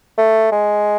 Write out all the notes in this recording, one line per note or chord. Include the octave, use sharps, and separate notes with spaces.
A3
G#3